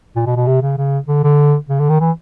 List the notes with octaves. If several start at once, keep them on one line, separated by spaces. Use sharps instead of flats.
A#2
B2
B2
C3
C#3
C#3
D3
D3
C#3
D3
D#3
E3